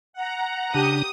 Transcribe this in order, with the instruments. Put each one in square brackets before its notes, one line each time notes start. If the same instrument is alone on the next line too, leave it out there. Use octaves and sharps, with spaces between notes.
[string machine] F#5 A#5
[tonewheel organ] C#3 D4 [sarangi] G4 [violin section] D#6